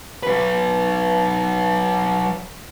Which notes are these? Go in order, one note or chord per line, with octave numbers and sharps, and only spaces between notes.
F#3 B4